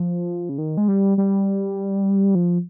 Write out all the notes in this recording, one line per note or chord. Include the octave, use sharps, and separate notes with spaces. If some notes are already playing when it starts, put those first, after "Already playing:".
Already playing: F3
C#3
D#3
G#3
G3
G3
F3